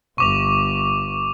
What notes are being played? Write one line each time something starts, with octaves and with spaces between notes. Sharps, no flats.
G1 C#6 D6 F7